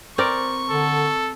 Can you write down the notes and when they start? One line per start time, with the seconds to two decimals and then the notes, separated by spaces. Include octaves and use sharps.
0.18 C4 A#4 D5 C#6
0.70 D3 A4